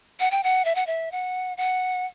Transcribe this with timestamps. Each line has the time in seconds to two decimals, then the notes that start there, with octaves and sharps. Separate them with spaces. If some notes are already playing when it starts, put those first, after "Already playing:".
0.20 F#5
0.31 G5
0.44 F#5
0.65 E5
0.75 F#5
0.87 E5
1.12 F#5
1.57 F#5